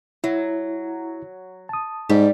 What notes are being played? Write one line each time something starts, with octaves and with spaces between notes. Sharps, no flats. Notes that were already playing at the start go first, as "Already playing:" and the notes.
F#3 E4
A5 D#6
G#2 G3